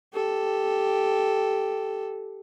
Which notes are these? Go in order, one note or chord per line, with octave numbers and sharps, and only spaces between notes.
G4 A4